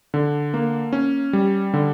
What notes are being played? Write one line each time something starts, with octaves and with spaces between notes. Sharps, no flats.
D3
A#3
C#4
G3
D3